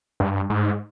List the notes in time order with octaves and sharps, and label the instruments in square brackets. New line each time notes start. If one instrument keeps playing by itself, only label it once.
[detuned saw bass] G2
G#2